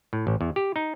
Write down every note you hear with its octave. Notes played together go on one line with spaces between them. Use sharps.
A2
A1
E2
G4
D#4